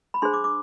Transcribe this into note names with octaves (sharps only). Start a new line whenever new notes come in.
B5
D4 G#4 C5 C6
D6
D6